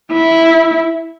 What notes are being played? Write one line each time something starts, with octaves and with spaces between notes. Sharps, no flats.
E4